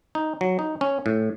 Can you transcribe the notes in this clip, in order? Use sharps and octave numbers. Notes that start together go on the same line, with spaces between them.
D#4
F#3
D#4
C#4
A2